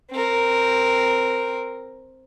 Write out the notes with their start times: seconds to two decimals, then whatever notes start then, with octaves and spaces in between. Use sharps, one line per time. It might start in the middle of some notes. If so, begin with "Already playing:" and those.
0.11 C4 A#4